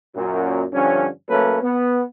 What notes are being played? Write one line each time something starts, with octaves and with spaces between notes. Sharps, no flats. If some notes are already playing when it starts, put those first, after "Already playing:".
F#2 A#2
G2 D3 F3 C#4
F#3 A3 A#3 C#4 A4 B4
B3